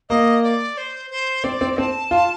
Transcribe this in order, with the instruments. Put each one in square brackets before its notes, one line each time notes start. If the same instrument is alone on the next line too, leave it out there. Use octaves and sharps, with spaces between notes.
[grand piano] A#3 [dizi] D#5
[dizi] D5
C5
C5
[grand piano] C4 [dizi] D5
[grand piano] C4
[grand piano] C4 [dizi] A5
[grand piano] F4